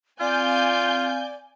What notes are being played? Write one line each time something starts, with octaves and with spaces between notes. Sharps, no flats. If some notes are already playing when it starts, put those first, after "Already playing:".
C4 F4 D5 F5 G#5 G6